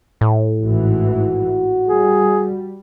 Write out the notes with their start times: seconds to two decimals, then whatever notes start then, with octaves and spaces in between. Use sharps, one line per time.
0.21 A2
0.62 A1 G#2 E3 F#4
1.87 G3 G#4